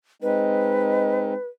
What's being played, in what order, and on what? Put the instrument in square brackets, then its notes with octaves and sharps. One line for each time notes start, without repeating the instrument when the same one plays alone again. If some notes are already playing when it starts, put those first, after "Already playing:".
[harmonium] G#3 C4 D#4 [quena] B4